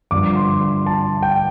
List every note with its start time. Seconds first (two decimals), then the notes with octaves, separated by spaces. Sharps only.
0.11 G2 D3 F3 D6
0.36 C6
0.61 C6
0.87 A5
1.23 G5